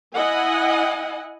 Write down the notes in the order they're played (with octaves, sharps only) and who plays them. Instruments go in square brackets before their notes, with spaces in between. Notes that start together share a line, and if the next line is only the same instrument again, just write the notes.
[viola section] E4 D#5 F#5 G#5